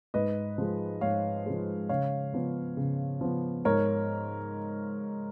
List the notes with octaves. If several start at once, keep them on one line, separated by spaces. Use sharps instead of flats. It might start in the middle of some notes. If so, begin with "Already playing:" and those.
G#2 B4 D#5
F3 G#3
G#2 C#5 F5
F3 G#3
C#3 C#5 F5
F3 B3
C#3
F3 B3
G#2 A#4 C#5